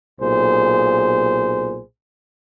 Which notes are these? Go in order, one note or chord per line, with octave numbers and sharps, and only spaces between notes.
B1 A#2 G#4 C5